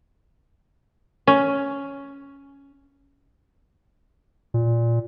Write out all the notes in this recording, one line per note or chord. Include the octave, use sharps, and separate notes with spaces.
C#4
A#2